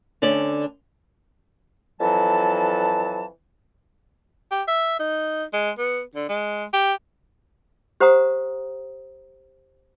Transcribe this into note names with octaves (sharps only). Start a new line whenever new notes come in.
D2 D3 C#4 D5
F2 E3 F#3 A5
G4
E5
D#4
G#3
B3
D3
G#3
G4
G4 C5 F#5 A#5 D#6